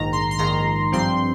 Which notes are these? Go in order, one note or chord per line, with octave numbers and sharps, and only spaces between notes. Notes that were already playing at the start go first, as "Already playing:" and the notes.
Already playing: A#1 G#2 D#3 A#5
C6
C6
A#1 G#2 D#3 A#5
G2 F3 C4 C6